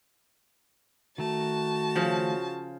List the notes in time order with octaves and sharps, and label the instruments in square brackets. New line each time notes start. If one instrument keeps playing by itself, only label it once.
[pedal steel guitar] D#3 A3 [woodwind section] F#4 [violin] A5
[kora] C#3 F3